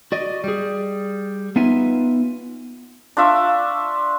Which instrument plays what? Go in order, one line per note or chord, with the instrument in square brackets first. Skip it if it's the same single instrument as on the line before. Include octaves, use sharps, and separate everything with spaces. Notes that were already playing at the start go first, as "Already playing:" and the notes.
[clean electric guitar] F#4 D5 D#5
G3 G#4
B3 D#4 F4 B4 E5 G#5
[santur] D4 F4 E5 C#6